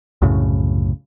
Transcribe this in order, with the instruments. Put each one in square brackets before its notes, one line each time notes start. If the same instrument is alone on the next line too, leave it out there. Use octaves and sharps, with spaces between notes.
[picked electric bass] C2 F#2 A2 C#3